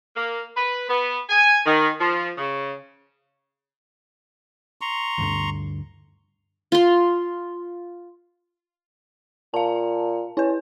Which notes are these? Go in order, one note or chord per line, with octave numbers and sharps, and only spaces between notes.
A#3
B4
B3
G#5
D#3
F3
C#3
A#5 C6 C#6
D2 G2 D3
F4 C6
A#2 F5 A5
C#4 E4 B4